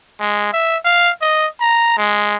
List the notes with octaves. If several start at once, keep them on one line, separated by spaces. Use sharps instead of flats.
G#3
E5
F5
D#5
A#5
G#3